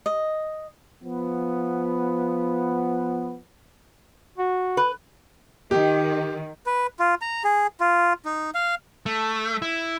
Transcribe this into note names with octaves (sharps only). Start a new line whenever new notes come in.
D#5
F3 B3
F#4
B4
D#3 G4
B4
F4
A#5
G#4
F4
D#4
F5
A3
E4